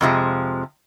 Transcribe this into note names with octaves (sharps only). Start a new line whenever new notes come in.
F2 C3 F3 G#3